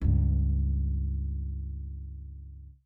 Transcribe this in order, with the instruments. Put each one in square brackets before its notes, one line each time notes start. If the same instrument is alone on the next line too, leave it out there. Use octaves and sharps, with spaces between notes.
[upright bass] C#2 G2